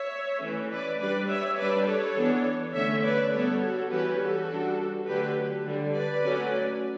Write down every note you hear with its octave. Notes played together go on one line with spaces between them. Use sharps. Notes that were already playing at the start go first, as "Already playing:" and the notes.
Already playing: C#5 E5
E3 A3 C#4
B4 D5
G3 D4 B4 D5
C#5 E5
G3 D4 B4 D5
A4 C#5
E3 B3 D4
D3 A3 C#4 C#5 E5
B4 D5
G3 B3 D4 A4 C#5
F#4 A4
E3 G3 C#4 G4 B4
F#4 A4
G3 D4
D3 F#3 A3 D4 G4 B4
D3 G3 D4
B4 D5
F#3 A3 C#4